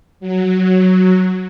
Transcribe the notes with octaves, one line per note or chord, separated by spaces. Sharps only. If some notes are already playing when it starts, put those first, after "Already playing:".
F#3